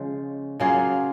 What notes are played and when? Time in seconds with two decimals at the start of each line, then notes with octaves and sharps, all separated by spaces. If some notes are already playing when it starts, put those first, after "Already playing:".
Already playing: C#3 F3 G#3
0.60 C#3 F#3 A#3 C#4 F4 G#4